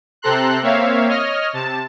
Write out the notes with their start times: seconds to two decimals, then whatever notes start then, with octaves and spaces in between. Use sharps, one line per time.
0.22 C3 C4 A4 A#5 C6 F#6
0.63 A#3 C4 C#5 E5 F5
1.09 C#5 D#5 F6
1.53 C3 A5